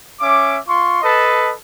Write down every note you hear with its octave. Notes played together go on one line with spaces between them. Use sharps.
C#4 E5 D6
F4 C6 C#6
A4 B4 D#5 A5